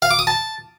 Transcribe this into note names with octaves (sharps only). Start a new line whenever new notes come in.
F5
D6
D#6
A5